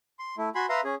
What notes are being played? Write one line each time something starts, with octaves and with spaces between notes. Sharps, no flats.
C6
A3 E4
F#4 G#5 B5 C6
B4 E5 F5 A#5 C6
C#4 G#4